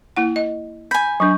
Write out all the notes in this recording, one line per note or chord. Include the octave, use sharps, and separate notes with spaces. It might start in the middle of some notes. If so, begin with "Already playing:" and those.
A#3 E4 F#5
D#5
G#5 B5 G6
F#3 D4 C#6 G6